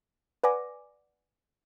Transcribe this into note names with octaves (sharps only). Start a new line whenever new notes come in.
B4 D5 F#5 G#5 D6 A#6